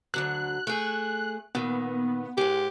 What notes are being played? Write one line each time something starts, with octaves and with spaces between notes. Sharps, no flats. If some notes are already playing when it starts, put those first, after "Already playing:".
D2 D3 F#3 F#6
A3 G#4
A#2 D#3 B3
G#2 G#3 G4